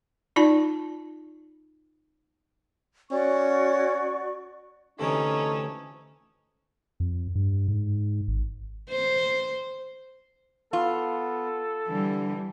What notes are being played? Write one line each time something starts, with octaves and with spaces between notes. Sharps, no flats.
D#4 F4 D5 A5
C#4 F#4 D5 C#6
D2 C3 E3 C#4 D#4 A4
F2
G2
G#2
G#1
C5
B3 F4 A4
D3 E3 G3